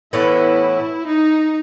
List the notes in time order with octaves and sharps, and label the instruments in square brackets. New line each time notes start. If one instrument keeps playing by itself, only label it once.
[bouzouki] A2 E3 B3 [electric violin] E4
[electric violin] D#4